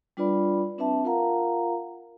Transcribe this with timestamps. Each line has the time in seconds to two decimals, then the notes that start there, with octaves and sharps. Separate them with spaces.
0.17 G3 D4 F4 B4 D5 B5
0.78 C4 D4 B4 E5 A5
1.05 F4 A#4 F5 F#5 A#5